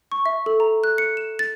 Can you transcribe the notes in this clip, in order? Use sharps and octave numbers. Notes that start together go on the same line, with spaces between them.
C#6
E5
A4
A#5
F#6
C#7
E7
A6